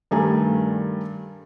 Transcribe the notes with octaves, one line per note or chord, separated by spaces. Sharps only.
G2 D#3 G3 A3 G#5 A#5